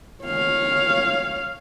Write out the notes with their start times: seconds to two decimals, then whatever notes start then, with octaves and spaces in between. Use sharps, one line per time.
0.24 C#5 F5